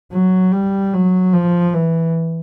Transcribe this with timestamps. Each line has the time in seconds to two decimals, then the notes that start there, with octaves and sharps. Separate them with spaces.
0.12 F#3
0.52 G3
0.93 F#3
1.34 F3
1.74 E3